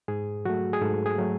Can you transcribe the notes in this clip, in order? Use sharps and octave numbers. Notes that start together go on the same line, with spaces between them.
G#2 G#4
F#3 A3 F#4
G#4
G#2 A4
G#4
F#3 A3